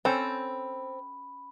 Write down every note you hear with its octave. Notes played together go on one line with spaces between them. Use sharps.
C4 C#4 A4 C5 B5